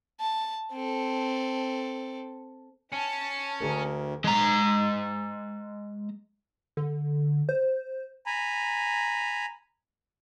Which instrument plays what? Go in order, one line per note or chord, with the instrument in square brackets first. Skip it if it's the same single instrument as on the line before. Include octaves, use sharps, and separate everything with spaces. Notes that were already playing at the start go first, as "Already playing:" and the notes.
[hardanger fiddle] A5
C4 A4
[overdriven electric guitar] C#4 [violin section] A5
[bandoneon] D2 [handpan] D3 G#4 A#4
[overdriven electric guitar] G#3 A#5
[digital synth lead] D3
C5
[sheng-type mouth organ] G#5 A#5 B5